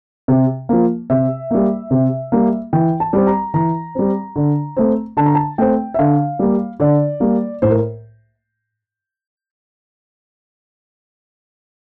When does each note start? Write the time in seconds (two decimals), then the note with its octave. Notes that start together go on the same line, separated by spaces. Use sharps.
0.28 C3
0.69 F3 A#3
1.10 C3 E5
1.51 G3 A#3
1.91 C3
2.32 G3 A#3
2.73 E3 G5
3.00 A5
3.13 G3 C4
3.27 A#5
3.54 E3 A#5
3.95 G3 C4
4.36 D3
4.77 A3 C4
5.17 D3 A5
5.26 A#5
5.35 A5
5.58 A3 C4 G5
5.94 E5
5.99 D3 F5
6.39 G3 A#3
6.80 D3 D5
7.20 G3 A#3
7.62 A2 C5
7.70 A#4